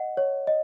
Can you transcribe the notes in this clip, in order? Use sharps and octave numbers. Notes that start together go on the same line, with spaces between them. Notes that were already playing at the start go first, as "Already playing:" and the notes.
Already playing: D#5 F#5
C#5
D#5